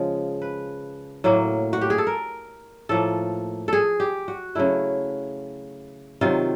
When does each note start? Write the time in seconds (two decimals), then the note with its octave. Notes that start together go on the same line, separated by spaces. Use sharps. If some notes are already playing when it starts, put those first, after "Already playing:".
Already playing: C#3 F3 G#3
0.42 B4
1.24 A2 F#3 A#3
1.73 F#4
1.81 G4
1.90 G#4
1.98 A4
2.07 A#4
2.89 A2 F3 A#3 A4
3.68 G#4 A4
4.00 G4
4.28 F#4
4.55 C#3 F#3 A3 E4
6.21 C3 D#3 F#3 F4